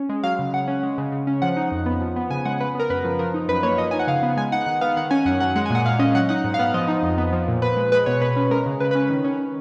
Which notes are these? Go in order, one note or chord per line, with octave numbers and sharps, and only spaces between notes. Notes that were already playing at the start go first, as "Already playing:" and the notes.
Already playing: C#4
G#3
F#3 F5
C#3
C#3 F#5
C#4
G#3
C#3
C#3
C#4
F3 F#5
D#4
F2
B3
F3
B3
C#3 G#5
G#3 F#5
C#3 B4
B3 A#4
F#2 B4
F3
F3 A#4
D#4
F#2 B4
A#3 C#5
F3 D#5
D#4 G#5
F#5
C#3 F5
B3
G#3 G#5
D#4 F#5
D#3 F#5
B3 F5
D#3 F#5
C#4 G#5
F#2 F#5
F#3 F#5
G#3 F#5
G#5
A#2 F#5
A#2 F5
C#4 D#5
F#3 F#5
D#4 F#5
G#2
F5
B3 F#5
F3 D#5
D#4
F2
B3
F3
A#2
A#2 B4
G#3
G#3 B4
B2 C#5
B2 B4
C#4
G#3 A#4
C#3
C#3 B4
B4
C#4
D#3
C#4